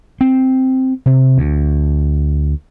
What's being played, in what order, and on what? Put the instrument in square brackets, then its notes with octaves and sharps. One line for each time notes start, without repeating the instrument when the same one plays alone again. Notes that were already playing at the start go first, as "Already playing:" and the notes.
[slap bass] C4
C3
D2